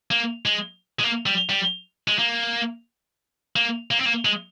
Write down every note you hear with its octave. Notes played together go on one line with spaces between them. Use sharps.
A#3
G#3
G#3
A#3
G3
G3
G#3
A#3
A#3
A#3
C4
A#3
G#3